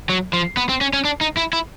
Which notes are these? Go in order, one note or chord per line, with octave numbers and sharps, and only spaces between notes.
F#3
F3
B3
C4
C#4
C#4
D4
D#4
E4
E4